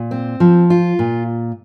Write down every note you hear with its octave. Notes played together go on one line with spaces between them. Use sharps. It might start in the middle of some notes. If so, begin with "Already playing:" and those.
Already playing: A#2
C4
F3
F4
A#2